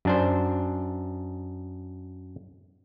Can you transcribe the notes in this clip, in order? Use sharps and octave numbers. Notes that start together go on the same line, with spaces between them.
F#2 D4 C5